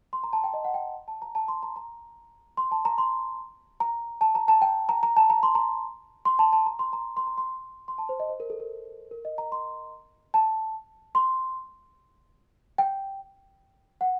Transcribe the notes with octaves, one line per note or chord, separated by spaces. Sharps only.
C6
A#5
A5
G5
D#5
F#5
G5
A5
A#5
A5
C6
A#5
A#5
C6
A5
A#5
C6
A#5
A5
A#5
A5
G5
A#5
A#5
A5
A#5
C6
A#5
C6
A5
A5
A#5
C6
A#5
C6
A#5
C6
C6
A5
C5
D#5
C5
A#4
A4
A#4
A#4
D#5
A#5
C6
A5
C6
G5
F#5